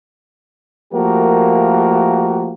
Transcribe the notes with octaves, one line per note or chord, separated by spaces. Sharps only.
F3 A3 A#3 F#4 G4 A#4